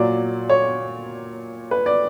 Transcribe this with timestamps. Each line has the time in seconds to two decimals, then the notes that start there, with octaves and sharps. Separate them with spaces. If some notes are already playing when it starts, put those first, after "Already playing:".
Already playing: A#2 F#3 D5
0.49 C#5
1.71 B4
1.86 D5